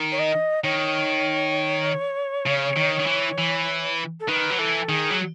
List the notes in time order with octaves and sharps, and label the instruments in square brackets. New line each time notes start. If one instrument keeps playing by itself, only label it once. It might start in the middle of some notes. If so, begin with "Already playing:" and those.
Already playing: [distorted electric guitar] D#3
[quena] C#5
D#5
[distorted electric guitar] D#3 [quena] C#5
[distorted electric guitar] C#3
D#3
D#3
E3
E3
[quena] A4
[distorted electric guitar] D#3 [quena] B4
[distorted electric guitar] F#3
[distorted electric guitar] E3 [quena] A4
[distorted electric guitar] D#3 [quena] G#4
[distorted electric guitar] F#3